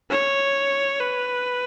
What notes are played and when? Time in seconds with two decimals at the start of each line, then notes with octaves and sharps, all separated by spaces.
0.10 C#5
1.00 B4